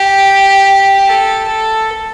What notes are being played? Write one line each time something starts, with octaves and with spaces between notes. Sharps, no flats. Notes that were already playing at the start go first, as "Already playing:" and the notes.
Already playing: G4
A4
A4